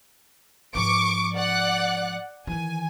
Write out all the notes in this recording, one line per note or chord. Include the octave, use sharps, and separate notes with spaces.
G#2 F3 C#6 D6 D7
D5 F#5 F#6
D#3 E3 G#5